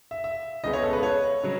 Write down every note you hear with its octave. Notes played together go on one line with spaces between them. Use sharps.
E5
E5
C#2 C#3 G#3 B3 D#5
C#5
A4
B4
C#5
C#3 F#3